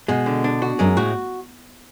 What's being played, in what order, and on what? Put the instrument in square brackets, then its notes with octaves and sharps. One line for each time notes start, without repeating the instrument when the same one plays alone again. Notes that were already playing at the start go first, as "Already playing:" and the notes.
[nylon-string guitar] B2 [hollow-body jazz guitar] G#3
[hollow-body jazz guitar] D3
D4
F#4
[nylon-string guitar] F#2 [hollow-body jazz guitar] G#3
[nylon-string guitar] A2 [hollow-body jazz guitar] F#4